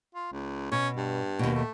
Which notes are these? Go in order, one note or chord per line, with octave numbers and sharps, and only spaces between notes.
F4
C#2
B2 C#4
G2
D#2 B2
A3